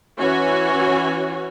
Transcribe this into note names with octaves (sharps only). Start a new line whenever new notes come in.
E3 C#4 F#4 C#5 G#5